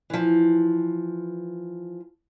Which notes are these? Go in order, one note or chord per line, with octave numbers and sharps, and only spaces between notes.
E3 F3